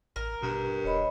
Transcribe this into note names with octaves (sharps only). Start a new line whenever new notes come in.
A1 A#4
G2 B2
D#1 C#5 D#5 B5